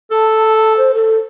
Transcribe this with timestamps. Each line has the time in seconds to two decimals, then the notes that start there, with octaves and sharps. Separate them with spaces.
0.11 A4 A5
0.76 C5
0.94 A4